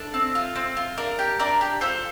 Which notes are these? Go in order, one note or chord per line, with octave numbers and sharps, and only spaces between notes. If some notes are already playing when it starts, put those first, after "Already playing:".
Already playing: D4 A4
C4
F4
C4
F4
D4 A#4
G4
D4 A#4 D5
G4
F4 A4 C5